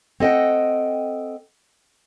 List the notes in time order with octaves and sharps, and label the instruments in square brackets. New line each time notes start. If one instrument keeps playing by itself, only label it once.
[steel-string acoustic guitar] C4 A4 D#5 F#5 G5